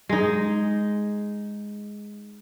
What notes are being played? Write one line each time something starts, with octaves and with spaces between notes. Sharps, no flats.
G#3 D#4